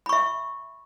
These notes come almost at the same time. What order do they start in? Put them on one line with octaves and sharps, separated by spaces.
B5 C#6 E5